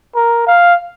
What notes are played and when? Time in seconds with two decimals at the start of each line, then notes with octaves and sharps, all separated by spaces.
0.15 A#4
0.47 F5